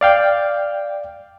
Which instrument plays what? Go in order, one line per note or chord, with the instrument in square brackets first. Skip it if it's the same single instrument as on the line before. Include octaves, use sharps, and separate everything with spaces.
[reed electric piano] D5 F5 G5